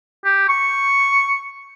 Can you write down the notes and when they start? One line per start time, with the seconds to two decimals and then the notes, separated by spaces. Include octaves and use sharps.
0.24 G4
0.49 C#6